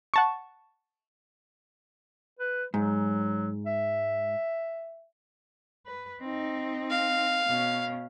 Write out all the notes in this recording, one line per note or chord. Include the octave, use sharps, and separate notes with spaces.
F#5 A5 C#6
B4
G#2 F#3
E5
B4
C4 D#4
F5
B2 C#4